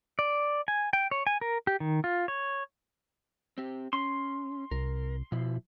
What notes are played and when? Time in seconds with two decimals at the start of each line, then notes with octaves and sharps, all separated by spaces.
0.19 D5
0.68 G#5
0.93 G5
1.11 C#5
1.27 G#5
1.41 A#4
1.67 G4
1.80 D#3
2.04 F4
2.28 C#5
3.58 C4 G4
3.93 C#4 C6
4.71 C2 A#4
5.32 B2 F3 E4